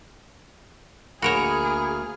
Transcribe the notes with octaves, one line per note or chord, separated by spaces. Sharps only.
D2 A#3 F#4 G#4 A#4 C#5 B5 F6